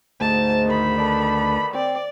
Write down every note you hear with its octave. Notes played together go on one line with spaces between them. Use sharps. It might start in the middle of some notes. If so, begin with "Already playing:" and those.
D2 G#2 A5
D#3 B5
A4 B4 D5
C4 D5